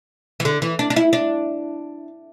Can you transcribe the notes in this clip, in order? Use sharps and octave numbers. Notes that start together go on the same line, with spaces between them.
E3
D3
E3
D4
D4
E4
D4